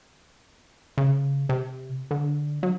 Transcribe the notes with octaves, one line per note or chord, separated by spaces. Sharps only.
C#3
C3
D3
F#3